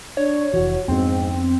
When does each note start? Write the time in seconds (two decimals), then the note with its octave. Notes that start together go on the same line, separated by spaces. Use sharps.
0.17 D4 C#5
0.54 F1 E3 F#4 C#5
0.88 F2 G#2 B3 C4 D4